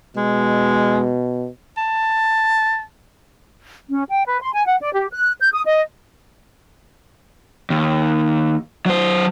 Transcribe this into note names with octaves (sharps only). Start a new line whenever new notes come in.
B2 G#3
A5
C#4
G5
B4
C6
G#5
F#5
D5
G4
F#6
G6
D#6
D#5
D#2
F#3 C5